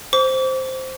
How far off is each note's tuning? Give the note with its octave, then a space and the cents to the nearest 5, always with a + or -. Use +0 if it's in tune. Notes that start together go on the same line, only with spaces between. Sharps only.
C5 +0 D6 -40